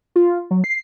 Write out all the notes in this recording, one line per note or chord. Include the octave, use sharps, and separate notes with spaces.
F4
F#3
C7